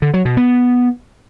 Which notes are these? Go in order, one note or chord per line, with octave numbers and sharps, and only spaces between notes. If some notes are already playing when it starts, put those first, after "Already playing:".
D3
F#3
B2
B3